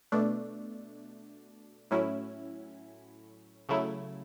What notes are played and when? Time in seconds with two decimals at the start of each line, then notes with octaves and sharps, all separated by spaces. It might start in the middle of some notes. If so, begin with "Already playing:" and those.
0.12 B2 A3 D4
1.91 A2 F#3 C#4 E4
3.69 C#3 F#3 A3 E4